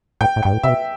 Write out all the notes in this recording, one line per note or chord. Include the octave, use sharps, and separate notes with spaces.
A2 G5
A2
G2 G5
A2
C3 E5
B2